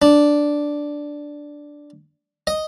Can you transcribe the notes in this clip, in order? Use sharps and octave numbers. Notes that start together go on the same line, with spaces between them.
D4
D#5